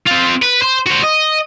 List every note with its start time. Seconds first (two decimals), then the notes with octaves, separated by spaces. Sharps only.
0.06 C4 F4
0.42 B4
0.62 C5
0.87 F#4 C5
1.04 D#5